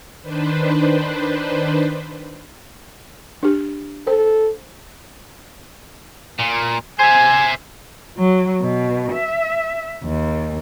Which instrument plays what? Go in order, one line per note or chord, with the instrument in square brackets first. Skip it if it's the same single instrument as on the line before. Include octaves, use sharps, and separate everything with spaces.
[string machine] D#3 D4 B4 C5
[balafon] D4 G4
[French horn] A4 [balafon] C5
[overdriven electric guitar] A#2
[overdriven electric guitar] C5 E5 [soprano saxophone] G#5
[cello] F#3
B2
E5
D#2